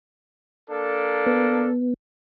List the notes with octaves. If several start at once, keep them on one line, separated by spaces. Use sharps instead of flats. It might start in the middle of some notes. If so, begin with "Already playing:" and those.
A#3 D4 A4
B3